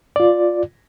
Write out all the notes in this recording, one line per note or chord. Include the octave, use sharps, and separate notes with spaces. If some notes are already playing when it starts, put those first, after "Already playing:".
F4 D5